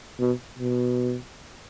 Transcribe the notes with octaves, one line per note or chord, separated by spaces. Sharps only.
B2
B2